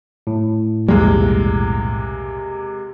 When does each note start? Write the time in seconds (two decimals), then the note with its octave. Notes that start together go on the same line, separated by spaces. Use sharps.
0.27 A2
0.88 B1 E2 C3 G3 G#3 A#3